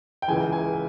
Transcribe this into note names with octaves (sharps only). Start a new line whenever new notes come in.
G5
C#2 C#3 E3 G#5
G#5